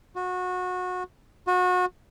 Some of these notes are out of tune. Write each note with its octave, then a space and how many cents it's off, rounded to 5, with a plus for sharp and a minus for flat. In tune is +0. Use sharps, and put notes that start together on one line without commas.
F#4 -25
F#4 -30